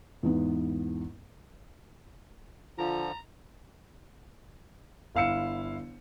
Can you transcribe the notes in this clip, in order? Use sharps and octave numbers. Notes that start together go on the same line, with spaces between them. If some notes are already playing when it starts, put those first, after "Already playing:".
E2 G#2 B3
D3 F3 F4 A#5
G1 E4 F5 E6 C#7 E7